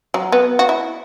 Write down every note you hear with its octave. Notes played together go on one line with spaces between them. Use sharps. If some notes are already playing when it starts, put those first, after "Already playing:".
F#3
B3
F#4
E4